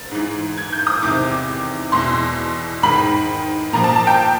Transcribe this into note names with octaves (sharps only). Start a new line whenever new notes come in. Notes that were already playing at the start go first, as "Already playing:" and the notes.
Already playing: A6
G#2 E3
G#6
G6
D#6
E2 C3 D#3 D6
E2 B2 C6
G#2 D#3 B5
A#2 F3 A#5
A5
A5
G5